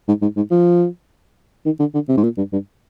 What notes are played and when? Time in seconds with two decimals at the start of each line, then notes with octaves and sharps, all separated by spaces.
0.08 G#2
0.22 G#2
0.37 G#2
0.51 F3
1.66 D#3
1.80 D3
1.94 D3
2.09 C3
2.17 G#2
2.24 A#2
2.38 G2
2.53 G2